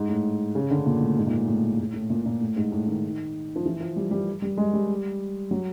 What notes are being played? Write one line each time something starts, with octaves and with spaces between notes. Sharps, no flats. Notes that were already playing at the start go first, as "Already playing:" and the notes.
Already playing: G#2
A2
C#3
D3
A#2
A2
G#2
A#2
A2
A2
A2
A2
A#2
A#2
A2
G#2
A2
D#3
F3
E3
F3
G3
G3
G3
G#3
G3
F#3